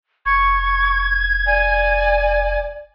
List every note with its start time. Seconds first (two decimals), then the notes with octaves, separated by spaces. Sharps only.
0.26 F1 C#6 G#6
1.46 D5 G#5